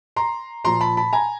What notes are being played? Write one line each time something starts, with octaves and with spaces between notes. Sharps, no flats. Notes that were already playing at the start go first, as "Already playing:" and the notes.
A#5 C6
A#2 F3 A#5 C6
A5 B5
A5 B5
G#5 A#5